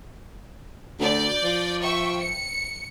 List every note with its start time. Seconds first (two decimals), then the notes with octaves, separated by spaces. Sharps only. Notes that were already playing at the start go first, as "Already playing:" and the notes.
1.00 D2 D5 G6
1.44 F3
1.81 E5 G5 C#6
2.21 C#7